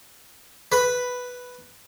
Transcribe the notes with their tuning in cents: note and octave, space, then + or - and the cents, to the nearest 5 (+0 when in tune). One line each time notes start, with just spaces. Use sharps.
B4 +0 B5 +5